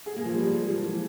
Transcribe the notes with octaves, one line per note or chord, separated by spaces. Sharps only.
G#4
A#3
F3
G3
G#3
G3
F3
E3